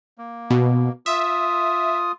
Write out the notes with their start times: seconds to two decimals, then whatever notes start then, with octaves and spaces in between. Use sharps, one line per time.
0.18 A#3
0.50 B2
1.06 F4 E5 D#6